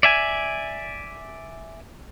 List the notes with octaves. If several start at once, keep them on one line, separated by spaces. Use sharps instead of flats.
D5 E5 G#5